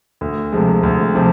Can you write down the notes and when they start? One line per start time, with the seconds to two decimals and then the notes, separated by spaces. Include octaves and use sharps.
0.21 D2
0.53 C3 F3 G#3
0.83 D2
1.15 C3 F3